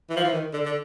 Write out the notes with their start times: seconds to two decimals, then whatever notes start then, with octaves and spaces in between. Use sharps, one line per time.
0.10 E3
0.16 F3
0.24 E3
0.32 D#3
0.53 D3
0.65 D3